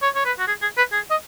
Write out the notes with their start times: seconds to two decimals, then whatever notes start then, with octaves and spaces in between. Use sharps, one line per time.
0.02 C#5
0.15 C#5
0.25 B4
0.39 F#4
0.48 G#4
0.62 G#4
0.77 B4
0.93 G#4
1.11 D#5